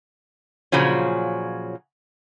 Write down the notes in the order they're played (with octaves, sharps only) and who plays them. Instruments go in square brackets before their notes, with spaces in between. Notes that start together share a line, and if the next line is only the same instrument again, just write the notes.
[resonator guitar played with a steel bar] A#2 C#3 F3 F#3 C#4